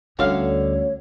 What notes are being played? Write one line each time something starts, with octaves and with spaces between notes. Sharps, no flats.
D2 D3 G3 A3 C#4 F#4 C#5 F5